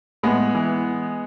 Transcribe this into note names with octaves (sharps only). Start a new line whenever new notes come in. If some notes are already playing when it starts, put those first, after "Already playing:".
A2 G#3 B3
E3